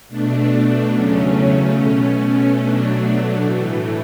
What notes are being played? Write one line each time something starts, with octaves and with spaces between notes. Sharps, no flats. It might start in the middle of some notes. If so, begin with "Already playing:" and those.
B2 A3 D4
E2 C#3 F#3 A3 C#4
B2 A3 C#4
B2 F#3 A3 D4
A2 E3 A3